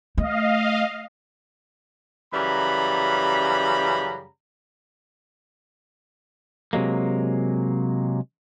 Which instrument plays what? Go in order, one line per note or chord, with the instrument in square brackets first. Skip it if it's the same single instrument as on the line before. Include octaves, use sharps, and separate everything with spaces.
[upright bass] A3 [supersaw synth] D#5 F5
[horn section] F#2 C#3 E3 G3 A#5 B5
[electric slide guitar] C3 F#3 G#3 A#3